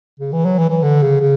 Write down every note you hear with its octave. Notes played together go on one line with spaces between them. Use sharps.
C#3
E3
F#3
E3
E3
D3
C#3
C#3